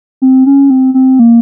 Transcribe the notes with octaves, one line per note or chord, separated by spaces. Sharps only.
C4
C#4
C4
C4
A#3